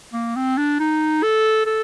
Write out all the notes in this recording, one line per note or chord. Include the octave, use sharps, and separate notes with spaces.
A#3
C4
D4
D#4
A4
A4